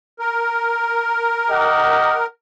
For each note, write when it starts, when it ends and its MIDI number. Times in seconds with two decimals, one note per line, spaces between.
0.19 2.26 70
1.48 2.21 67
1.48 2.21 75
1.48 2.21 78